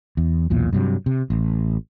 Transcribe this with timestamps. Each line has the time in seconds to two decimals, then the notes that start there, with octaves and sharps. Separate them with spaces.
0.17 E2
0.50 B1 E2 A#2
0.73 G2 C3 F#3
1.06 C3
1.30 A1